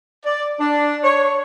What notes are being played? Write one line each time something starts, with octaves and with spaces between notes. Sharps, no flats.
D5
D4
C#5